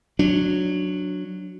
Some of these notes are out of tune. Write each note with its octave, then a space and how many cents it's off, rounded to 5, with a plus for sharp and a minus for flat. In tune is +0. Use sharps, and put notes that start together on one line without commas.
F#3 -10 D4 +0